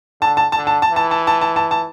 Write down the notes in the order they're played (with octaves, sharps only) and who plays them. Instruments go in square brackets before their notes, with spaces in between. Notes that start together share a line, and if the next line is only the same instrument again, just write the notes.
[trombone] D3 [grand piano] A5
[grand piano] A5
A5
[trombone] D3
[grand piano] A5
A5
[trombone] E3
[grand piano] A5
A5
A5
A5
A5
A5